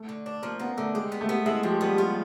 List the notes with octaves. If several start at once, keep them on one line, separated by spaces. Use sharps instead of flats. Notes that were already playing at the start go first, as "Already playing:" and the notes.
Already playing: A3
D3
D4
F3 A#3
A#3 B3
D3 A3
G#3 G4
B3
A3
B3
G#3 E4
F3 G4
G3 B3
F4